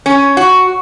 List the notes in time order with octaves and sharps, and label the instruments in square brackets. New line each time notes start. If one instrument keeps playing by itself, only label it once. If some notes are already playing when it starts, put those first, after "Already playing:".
[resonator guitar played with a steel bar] C#4
F#4